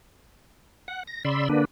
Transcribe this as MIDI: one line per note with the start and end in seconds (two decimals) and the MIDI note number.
0.88 1.03 78
1.07 1.23 94
1.25 1.48 49
1.25 1.48 74
1.25 1.48 83
1.25 1.48 84
1.25 1.48 88
1.49 1.65 50
1.49 1.65 58
1.49 1.65 62
1.49 1.65 71